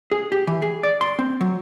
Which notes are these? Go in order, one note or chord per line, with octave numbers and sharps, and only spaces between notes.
G#4
G4
E3
G#4
D5
C6
C4
F#3